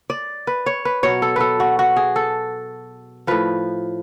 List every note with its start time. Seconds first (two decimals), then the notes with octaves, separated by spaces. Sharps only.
0.10 D5
0.47 B4
0.66 C#5
0.85 B4
1.03 B2 F#3 C#5
1.22 A4
1.36 A4 B4
1.60 F#4
1.79 F#4
1.96 G#4
2.16 A4
3.27 A2 F3 B4